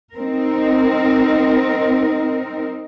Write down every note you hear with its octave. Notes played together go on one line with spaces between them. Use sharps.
C4 D#4 A#4